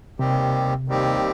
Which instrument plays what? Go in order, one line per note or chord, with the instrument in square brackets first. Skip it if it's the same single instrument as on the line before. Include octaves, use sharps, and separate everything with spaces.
[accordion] D#2 D#3 G3 C4 G4 [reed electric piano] C3
[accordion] D#2 D#3 G3 C4 G4